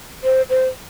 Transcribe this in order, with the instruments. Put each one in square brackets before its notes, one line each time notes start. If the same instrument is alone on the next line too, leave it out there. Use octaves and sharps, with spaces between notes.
[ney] C5
C5